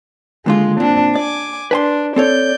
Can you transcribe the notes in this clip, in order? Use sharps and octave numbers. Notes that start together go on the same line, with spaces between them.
D#2 D3 G#3 F4
A#2 C4 D4
D5 G#5 D6
D4 B4 G#5 C6
C4 A4 C#5 D5 G6